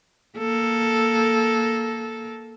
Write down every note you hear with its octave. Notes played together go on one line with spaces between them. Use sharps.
A#3 A4